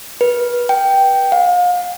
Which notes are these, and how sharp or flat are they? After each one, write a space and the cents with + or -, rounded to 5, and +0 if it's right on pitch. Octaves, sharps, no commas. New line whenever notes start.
B4 -30
G5 -5
F5 +35